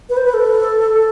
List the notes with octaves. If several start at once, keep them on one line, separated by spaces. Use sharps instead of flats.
B4
C5
B4
A4